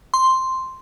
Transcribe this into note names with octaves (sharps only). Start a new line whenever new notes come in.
C6